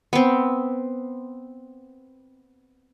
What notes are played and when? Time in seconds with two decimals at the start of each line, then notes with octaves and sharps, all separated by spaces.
0.13 B3 C4